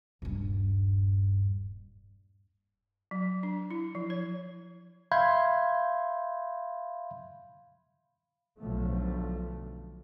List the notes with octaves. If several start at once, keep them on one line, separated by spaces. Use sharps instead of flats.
D#1 G2
F#3
D4
E4
F3
C#5
E5 F5 B5 C6 G6 G#6
B1 D3 F3 A3